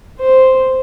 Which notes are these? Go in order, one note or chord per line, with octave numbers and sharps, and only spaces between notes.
C5